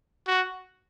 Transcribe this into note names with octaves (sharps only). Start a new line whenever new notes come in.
F#4